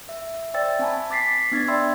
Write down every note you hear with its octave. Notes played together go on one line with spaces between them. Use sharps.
E5
C5 D5 E5 G5 E6 A6
C4 G#5 A5 B5
D6 A6 B6 C7
B3 D4 G#6 A6
D5 E5 G5 B5 C6 E6